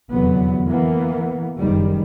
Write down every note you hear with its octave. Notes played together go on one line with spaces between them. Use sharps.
F1 E2 D3 F#3 B3
E3 A#3 B3
F#1 D#3 G3